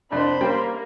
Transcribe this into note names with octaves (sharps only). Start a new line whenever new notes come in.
C2 F2 D4 C5 B5
G3 A#3 C#4 G5